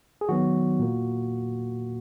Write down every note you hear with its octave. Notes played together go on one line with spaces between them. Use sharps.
G#4
D#3 F#3 B3 F#4
A#2 A#3